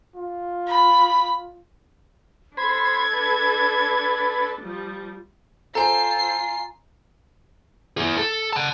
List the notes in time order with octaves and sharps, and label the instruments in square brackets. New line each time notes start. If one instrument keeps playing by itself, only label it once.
[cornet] F4
[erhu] B5
[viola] D4 A4 [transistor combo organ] C5 B5 [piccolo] G#6
[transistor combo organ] B4
[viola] F3 G3
[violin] F4 C7 [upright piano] A4 C5 [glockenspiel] G#5 A#5
[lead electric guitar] E4 G#4
A4
F#5 A5